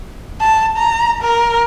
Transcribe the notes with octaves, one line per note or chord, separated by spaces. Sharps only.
A5
A#5
A#4